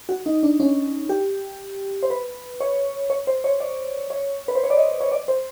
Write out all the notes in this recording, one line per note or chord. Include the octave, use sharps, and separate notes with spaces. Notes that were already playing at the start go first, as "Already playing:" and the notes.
F#4
D#4
D4
C#4
G4
C5
B4
C#5
C#5
C5
C#5
D5
C#5
B4
C5
C#5
D5
D#5
C#5
D5
C5